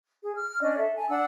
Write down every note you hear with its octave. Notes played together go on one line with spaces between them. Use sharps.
G#4
F6
C#4 D4 D5 D#5
A4 E5
G#5 A5
D4 F#5 E6